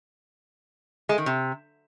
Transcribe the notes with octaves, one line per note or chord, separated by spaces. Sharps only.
G#3
D#3
C3